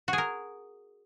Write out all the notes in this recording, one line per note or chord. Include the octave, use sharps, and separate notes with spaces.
F#4
G#4
A#4